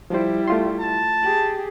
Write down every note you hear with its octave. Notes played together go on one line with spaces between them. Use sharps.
F3 G3 E4 C5
A3 F4 C6
A5
G4 G#4